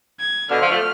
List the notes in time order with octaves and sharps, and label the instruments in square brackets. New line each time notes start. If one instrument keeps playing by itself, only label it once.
[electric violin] G#6
[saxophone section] B2 D3 [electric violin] F6
[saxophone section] D3 F3
F3 A3